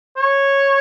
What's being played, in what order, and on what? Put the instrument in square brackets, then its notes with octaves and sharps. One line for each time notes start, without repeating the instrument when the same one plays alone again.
[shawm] C#5